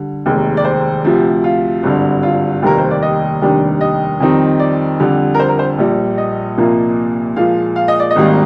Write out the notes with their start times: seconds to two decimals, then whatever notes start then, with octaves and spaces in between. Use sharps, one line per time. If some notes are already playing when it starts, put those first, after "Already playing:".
Already playing: D3 G3
0.26 F1 D#2 D#3 G#3
0.57 D5
0.65 C5
1.04 D2 C3 F3
1.44 F4
1.83 G#1 G2 D3
2.23 F4
2.63 F1 D#2 D#3 G3 A#3 A#4
2.78 C5
2.91 D5
3.02 D#5
3.41 F1 D#2 D#3 G3 D4
3.81 D#5
4.20 F2 D#3 G3 C4 D#4
4.60 D5
5.00 F2 D3 G3
5.34 A#4
5.39 C5
5.49 A#4
5.59 C5
5.78 A#1 A#2 G3
6.18 D#5
6.57 C2 A#2 F3 A#3
7.36 A#2 F3 G#3 F5
7.76 F5
7.88 D#5
8.00 D5
8.11 D#5
8.16 G#1 G#2 D#3 G3 A#3